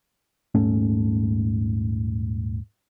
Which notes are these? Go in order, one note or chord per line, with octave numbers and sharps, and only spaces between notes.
D#1 G#2 A3 C#4